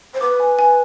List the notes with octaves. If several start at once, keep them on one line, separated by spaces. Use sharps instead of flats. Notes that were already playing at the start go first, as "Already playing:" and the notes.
C5
B4 D6
G#5
G#5